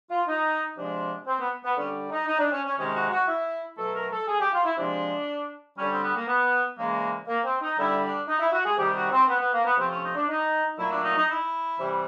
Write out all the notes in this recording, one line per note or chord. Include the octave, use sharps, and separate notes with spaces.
F4
D#4
C3 F3 G#3 D4
C4
B3
B3
D3 G3 C#4
D#4
D#4
D4
C#4
C#4
C3 D#3 G#3 C#4
F#4
F#4
E4
B2 F#3 A3 A4
A#4
A4
G#4
G4
F4
E4
C3 F3 G#3 D4
D3 G3 C#4
C4
B3
A#3
B3
C#3 E3 G#3 A#3
A#3
C4
D#4
D3 G3 E4
D4
D#4
E4
F#4
G#4
C3 D#3 G3 G4
F#4
C4
B3
B3
A#3
B3
C3 F3 A3 C4
C#4
D#4
D4
D#4
A#2 F#3 A3 E4
D4
D#4
D#4
E4
C3 E3 G3